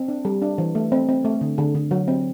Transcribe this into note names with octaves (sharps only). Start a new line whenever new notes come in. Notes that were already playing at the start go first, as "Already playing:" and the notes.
Already playing: C4
D4
G3
D4
E3
A3
C4
C4
A3
D3
D3
D3
F#3
C4